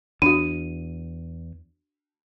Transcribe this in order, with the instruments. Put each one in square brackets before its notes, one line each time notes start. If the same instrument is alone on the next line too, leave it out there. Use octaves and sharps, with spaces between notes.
[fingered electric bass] E2 [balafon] D4 F#4 [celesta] D#7